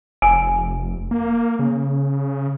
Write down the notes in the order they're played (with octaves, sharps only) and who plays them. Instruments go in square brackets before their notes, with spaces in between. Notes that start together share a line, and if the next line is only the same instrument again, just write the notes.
[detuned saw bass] F1 [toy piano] G#5
[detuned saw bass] A#3
C#3